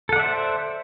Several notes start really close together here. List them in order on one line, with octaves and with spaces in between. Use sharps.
A4 F#5 D5 E5 C5